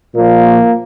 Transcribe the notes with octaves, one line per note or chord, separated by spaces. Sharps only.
A#2 F3 A#3